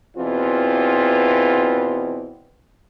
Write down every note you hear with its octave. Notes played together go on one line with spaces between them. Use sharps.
E2 B2 E3 C4 F4